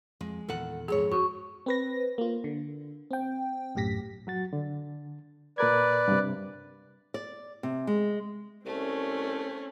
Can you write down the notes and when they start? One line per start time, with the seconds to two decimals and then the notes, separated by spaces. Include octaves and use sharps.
0.21 F2 G#3
0.49 E2 A#2 D#3 A4 F#5
0.88 F2 G#2 G#4 C#5
1.12 F#2 F#4 C#6
1.66 C4 B4 A#6
2.18 A#3 F4
2.44 D3
3.11 C4 G5
3.75 B1 F#2 A2 G4 A#6 B6
4.27 F#3 F#4 A6
4.53 D3
5.58 A#2 A#4 B4 D5 G#6
6.08 G2 C3
7.14 D5
7.63 C3
7.87 G#3
8.66 C2 A3 C4 C#4